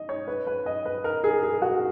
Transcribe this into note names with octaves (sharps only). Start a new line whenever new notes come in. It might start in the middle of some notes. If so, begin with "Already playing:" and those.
Already playing: D#5
C#5
B4
B4
D#5
B4
A#4
G#4
G#4
F#4